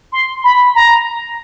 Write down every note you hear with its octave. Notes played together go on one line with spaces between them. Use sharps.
C6
B5
A#5